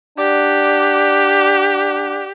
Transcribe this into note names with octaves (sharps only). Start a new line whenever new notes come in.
D4 G4 D5 F#5